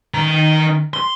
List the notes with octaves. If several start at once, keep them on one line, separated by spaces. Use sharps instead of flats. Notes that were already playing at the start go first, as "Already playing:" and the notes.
D#3 A#5
C6